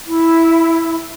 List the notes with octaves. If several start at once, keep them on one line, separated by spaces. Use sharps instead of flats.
E4